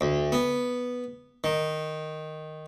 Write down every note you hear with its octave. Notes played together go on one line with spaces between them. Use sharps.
D2
B3
D#3